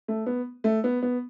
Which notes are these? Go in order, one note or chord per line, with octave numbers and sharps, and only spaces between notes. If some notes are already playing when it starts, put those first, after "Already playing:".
A3
B3
A3
B3
B3